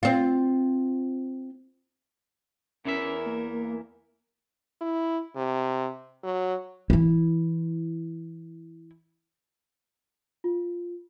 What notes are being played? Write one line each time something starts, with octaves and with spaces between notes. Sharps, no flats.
C4 F4
E2 E3 C#4 A#4 E5
A#3
E4
C3
F#3
E3 E4
F4